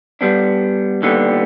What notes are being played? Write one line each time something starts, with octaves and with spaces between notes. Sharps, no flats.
G3 B3 D4
D#2 D3 G3 B3